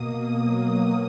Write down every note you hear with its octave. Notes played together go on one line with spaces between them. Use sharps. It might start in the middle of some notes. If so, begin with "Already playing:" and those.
Already playing: B2 A#3 D#6
B2 F#3 A#3